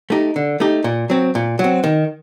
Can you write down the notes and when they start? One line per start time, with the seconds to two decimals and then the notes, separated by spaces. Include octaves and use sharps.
0.10 A3 D#4 G4
0.36 D3
0.60 A3 D#4 G4
0.84 A#2
1.10 F#3 C4
1.35 A#2
1.59 F#3 C4
1.84 D#3